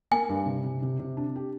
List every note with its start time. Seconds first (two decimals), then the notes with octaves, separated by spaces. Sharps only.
0.11 A#3 G#5
0.29 G2
0.46 C3
0.64 C3
0.82 C3
0.99 C3
1.17 D4
1.36 G4